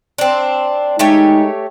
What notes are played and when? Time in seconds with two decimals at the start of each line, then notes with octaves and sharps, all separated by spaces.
0.18 C4 D4
0.99 G#3 A3 D#4 G4 C#5